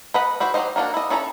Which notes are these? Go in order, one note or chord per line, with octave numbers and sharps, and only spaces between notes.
B4 D#5 F#5 B5
E4 F#4 B4 C5
F#3 G4 C5 D#5
D#3 A#3 D4 F#4
E4 D#5
C#4 E4 A4 D#5 A#5